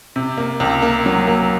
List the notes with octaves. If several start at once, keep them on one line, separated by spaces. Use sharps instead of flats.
C3
A#3
C#2
A#3
F#3
A#3